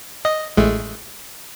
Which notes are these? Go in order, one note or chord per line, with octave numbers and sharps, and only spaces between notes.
D#5
A1 G#3 A3